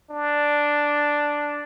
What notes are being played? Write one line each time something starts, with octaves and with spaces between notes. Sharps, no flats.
D4